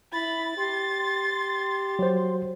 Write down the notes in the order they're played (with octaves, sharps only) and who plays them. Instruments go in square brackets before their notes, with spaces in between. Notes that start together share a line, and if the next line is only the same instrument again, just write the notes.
[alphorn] E4 [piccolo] B5 [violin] A6
[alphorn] G4 [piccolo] C6
[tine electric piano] F#3 C5